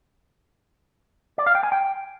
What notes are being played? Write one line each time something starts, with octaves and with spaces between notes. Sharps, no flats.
D5
F5
G5
G#5
G5